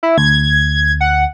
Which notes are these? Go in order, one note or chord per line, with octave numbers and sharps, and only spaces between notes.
E4
D2 G#6
F#5